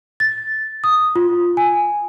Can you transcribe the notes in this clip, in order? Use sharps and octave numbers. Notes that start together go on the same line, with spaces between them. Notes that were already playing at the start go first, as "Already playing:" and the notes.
A6
D#6
F4
G#5